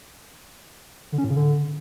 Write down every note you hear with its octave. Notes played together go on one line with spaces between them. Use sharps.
D3
C#4
A2
C#3
D3